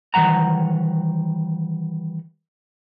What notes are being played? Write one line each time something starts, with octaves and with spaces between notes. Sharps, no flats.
D#3 E3 G3 F#5 A#5